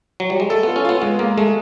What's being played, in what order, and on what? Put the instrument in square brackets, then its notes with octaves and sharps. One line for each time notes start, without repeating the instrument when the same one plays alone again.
[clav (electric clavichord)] F#3
G3
G#3
[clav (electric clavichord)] A3 [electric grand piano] A4
[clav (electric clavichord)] B3 [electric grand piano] F4
[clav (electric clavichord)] C#4
[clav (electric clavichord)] B3 [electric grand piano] F4
[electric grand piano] G#3 [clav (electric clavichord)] B3
[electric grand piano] G#3 [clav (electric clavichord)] A#3
[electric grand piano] G#3 [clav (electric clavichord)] A3